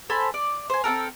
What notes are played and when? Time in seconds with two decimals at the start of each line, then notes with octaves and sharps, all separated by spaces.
0.10 A4 C5 G#5 B5
0.34 D5
0.70 C5 G#5
0.84 C4 F#4 A4 A#4